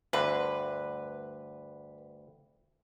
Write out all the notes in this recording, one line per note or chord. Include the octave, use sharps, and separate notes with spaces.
D2 G2 D3 B4